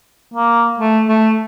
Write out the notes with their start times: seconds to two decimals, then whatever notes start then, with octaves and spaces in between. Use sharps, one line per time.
0.34 A#3
0.79 A3
1.08 A3